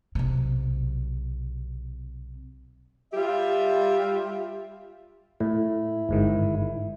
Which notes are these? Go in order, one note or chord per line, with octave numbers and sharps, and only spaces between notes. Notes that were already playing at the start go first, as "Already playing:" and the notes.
B1 C3
G3 F4 G4 E5
A2 E4
G1 G#2 D#3